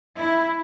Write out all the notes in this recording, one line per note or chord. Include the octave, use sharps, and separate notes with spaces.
E4